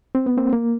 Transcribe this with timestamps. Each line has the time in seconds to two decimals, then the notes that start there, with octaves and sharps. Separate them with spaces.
0.15 C4
0.26 B3
0.37 A#3 C4
0.53 A#3